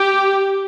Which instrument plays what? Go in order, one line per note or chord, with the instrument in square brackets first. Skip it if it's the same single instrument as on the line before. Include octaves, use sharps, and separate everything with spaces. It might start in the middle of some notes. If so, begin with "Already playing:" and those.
Already playing: [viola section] G4